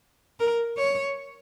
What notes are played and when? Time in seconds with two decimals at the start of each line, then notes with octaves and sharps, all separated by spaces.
0.40 A#4
0.77 C#5